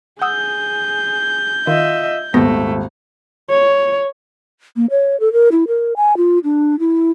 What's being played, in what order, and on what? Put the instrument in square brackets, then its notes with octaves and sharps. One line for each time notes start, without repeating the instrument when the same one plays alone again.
[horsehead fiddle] G#4 [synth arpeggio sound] F#5 D#6 E6 [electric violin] G6
[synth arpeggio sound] D#3 [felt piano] F4 [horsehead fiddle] D#5 E5
[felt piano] D#1 G#1 [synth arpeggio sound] D#3 B3 A#6 [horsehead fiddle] A3
[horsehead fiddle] C#5
[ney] A#3
C#5
A4
A#4
E4
A#4
G#5
F4
D4
E4